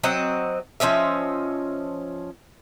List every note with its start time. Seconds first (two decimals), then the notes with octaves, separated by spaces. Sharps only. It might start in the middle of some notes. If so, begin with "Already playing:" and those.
0.04 F#3 C4 D#5 F#5
0.80 F3 C#4 D#5 E5